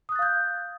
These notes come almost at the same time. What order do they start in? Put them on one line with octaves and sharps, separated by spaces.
D#6 F#6 A6 F5 G6